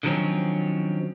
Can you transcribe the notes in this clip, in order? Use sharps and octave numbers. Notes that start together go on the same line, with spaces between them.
D3 D#3 F3 F#3 C4 C#4